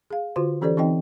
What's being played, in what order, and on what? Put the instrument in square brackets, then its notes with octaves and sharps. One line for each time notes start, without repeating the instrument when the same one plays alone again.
[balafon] G#4 F5
D3 F4 F#4 C5 C6
E3 C#4 G4 A4 C5 D5
E3 C4 D#4 D#5 G5